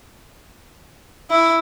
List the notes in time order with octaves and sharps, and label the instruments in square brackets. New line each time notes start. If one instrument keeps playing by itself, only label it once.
[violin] E4